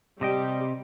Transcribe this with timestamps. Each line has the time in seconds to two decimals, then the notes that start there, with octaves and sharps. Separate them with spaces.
0.21 C3 G3 D#5 G5